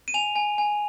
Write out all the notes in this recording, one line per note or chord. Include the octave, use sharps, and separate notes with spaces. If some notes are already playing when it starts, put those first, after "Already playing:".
D#7
G#5 F7
G#5
G#5